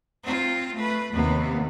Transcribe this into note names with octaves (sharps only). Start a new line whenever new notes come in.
C4 F4
A3 B4
D#2 C3 B3